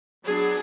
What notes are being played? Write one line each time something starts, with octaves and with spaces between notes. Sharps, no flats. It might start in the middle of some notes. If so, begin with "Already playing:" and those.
F#3 B3 D4 G#4